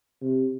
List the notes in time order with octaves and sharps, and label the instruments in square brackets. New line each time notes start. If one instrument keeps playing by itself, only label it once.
[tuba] C3